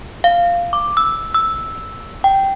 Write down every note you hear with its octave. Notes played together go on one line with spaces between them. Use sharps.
F5
D6
E6
E6
G5